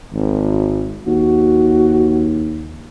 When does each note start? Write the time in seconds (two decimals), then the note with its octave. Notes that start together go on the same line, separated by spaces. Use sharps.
0.12 G#1
1.07 D#2 F#4